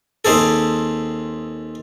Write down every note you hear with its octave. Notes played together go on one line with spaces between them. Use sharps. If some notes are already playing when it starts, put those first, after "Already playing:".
D#2 C4 G#4 A4